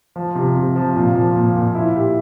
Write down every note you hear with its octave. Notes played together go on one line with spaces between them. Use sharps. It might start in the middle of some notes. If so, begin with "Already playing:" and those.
F3
C3
C3
F3
A#2
F3
A#2
A#2
E4
G4